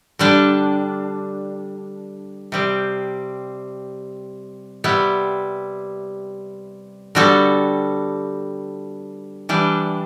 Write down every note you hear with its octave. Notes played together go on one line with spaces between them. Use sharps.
D3 G3 D4
C3 G3 C4
C3 G3 B3 E4
D3 G3 B3 F#4 A4
E3 G3 D4